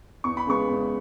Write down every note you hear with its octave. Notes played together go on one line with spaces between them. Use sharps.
E2 C#6
B5
C#3 G#3 B3 C#6
E2